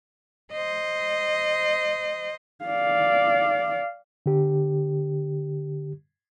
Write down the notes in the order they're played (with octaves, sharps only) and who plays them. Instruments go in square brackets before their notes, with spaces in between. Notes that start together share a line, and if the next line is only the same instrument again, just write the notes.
[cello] C5 D#5
[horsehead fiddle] D5 F5
[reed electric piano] D3 G4